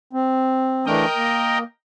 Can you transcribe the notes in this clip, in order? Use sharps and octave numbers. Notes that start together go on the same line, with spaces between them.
C4
E3 A3 D4 A#4 D#5 G5
A#3